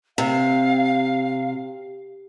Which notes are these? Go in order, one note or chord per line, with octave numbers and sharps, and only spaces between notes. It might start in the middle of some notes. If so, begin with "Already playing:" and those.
C3 F5